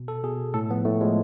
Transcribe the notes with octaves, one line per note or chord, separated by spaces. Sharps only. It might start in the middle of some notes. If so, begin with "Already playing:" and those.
Already playing: B2
A4
B2 G#4
A2 A4
F3 B3
A2 A3
F3 G#3